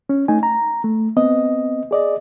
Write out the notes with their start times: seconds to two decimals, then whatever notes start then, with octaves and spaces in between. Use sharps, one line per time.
0.09 C#4
0.28 A3 D#4 G#5
0.43 A#5
0.84 A3
1.17 B3 C4 D#5
1.91 G#4 D5 D#5